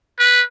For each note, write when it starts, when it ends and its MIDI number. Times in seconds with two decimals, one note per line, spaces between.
0.20 0.42 71